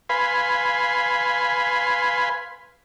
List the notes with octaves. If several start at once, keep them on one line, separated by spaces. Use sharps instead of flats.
B4 F5 G#5 B5 C6